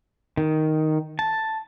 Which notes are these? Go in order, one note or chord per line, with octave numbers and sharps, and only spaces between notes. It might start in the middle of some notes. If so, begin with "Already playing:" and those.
D#3
A5